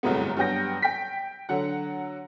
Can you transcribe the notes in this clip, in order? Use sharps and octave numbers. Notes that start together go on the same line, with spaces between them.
G1 C2 F#2 A2 G#3 B3
G2 F#3 B3 G5 G6 A#6
G5 B6
D3 F#3 F#5